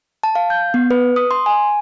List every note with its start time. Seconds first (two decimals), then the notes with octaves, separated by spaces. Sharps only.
0.23 A5
0.35 F5
0.50 G6
0.74 B3
0.91 B4
1.16 D#6
1.31 C6
1.46 G#5